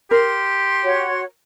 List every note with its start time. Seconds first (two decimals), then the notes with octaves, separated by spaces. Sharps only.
0.11 G4 A#4 C6
0.83 F#4 C#5